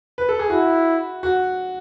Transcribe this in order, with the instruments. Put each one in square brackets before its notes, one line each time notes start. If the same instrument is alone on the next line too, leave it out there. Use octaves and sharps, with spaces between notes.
[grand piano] B4
A4
G#4
[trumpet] E4 [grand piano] F#4
[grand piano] F#4